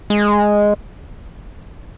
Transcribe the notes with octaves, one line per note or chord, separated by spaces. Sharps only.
G#3